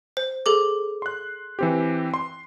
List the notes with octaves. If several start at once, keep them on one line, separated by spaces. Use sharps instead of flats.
C5
G#4 A4 D6
C6 F#6
E3 C4 G4
C6